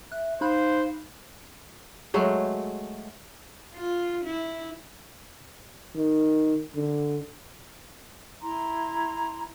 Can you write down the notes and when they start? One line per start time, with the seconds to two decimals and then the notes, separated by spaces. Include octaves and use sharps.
0.12 E5 F#6
0.41 D#4 C5 F5 B5 F#6
2.14 F#3 G#3 A3
3.75 F4
4.25 E4
5.95 D#3
6.75 D3
8.42 E4 A#5 C6